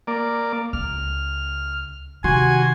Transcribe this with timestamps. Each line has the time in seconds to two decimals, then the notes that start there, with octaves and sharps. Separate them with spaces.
0.07 A#3 D5
0.73 C#2 F6
2.24 C3 D#3 F#4 G#5 C6